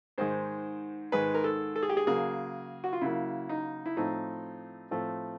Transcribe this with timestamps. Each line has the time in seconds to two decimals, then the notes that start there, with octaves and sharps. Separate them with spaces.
0.18 G#2 D#3 G#3 C5
1.12 G#2 D#3 G#3 B4
1.35 A#4
1.44 A4
1.76 A4
1.83 G#4
1.89 G4
1.97 G#4
2.07 C#3 F#3 A#3 G#4
2.84 F#4
2.93 F4
3.01 C#3 F#3 A#3 E4
3.49 D#4
3.86 E4
3.97 A2 F3 A3 C4 D#4
4.91 A2 F3 A3 C4